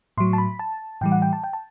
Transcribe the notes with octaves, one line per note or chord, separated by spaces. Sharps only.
A2 F#3 C6
A5
B5
A5
A2 E3 G3 G5
F#5
G5
A5
G5
A5